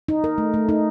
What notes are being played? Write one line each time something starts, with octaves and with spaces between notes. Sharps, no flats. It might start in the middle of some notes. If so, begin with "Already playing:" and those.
D#4
A#4
A3
A3
D#4